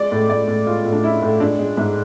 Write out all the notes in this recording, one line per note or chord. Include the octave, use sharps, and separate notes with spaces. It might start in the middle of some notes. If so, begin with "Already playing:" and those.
Already playing: G#3 D5
A2
A2 D5
A2
G#3 F4
A2
D4
G#3 E4
A2
G#3 D4
G#3
G#2